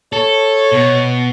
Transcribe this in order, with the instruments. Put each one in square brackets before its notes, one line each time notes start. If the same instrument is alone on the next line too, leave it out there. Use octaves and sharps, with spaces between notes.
[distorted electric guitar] A4 [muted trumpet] C#5
[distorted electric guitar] B2